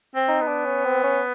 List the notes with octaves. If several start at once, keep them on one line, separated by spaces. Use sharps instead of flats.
C4
D#4
B3
D4
C#4
C4
C#4